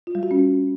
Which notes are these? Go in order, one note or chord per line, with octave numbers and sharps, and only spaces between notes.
F4
G3
F#4
C#4